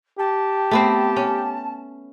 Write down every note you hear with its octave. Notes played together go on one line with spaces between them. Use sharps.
G4 A5
A3 B3 C4
C#4